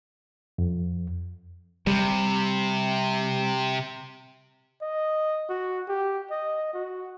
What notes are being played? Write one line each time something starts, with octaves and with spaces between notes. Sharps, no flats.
F2
C3 G3
D#5
F#4
G4
D#5
F#4